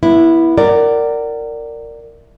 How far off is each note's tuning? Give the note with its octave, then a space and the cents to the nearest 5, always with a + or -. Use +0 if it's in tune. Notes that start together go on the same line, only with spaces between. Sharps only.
B3 -30 E4 +0
A#4 -15 D5 +0 F#5 +30